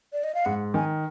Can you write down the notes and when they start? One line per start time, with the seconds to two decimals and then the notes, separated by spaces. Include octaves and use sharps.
0.13 D5
0.24 D#5
0.35 F5
0.45 G#2 F#5
0.74 D#3 G#5